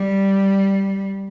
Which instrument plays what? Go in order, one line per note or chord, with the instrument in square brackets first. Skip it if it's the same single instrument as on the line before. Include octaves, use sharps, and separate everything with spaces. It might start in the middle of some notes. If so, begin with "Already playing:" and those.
Already playing: [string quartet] G3